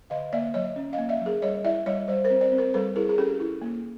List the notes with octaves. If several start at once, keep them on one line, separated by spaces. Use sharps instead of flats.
D3 D#5 F5
A#3 D5 E5
F#3 C#5 D#5
C#4
D#5 F5
A#3
D5 E5
F#3
G#4 A#4
G3 C#5 D#5
E4 D5 E5
G3 C#5 D#5
G3 C5 D5
A#4 C5
C4
C5 D5
C4
A#4 C5
G3 A4 B4
E4 G#4 A#4
G#4
C#4 G4 A4
E4
A#3